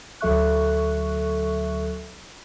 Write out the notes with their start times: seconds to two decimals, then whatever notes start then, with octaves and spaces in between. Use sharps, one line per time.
0.21 D2 F#3 A4 E5 C#6 F#6